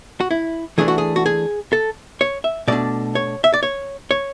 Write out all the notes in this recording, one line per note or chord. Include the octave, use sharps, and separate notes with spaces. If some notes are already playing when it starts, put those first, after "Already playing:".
F#4
E4
E3 A3 D4 G#4
F#4
G#4
F#4
G#4
A4
C#5
E5
B2 A3 D4 D5
C#5
E5
D5
C#5
C#5